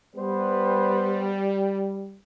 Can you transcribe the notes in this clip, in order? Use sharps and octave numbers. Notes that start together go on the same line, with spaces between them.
G3 B3 B4 C5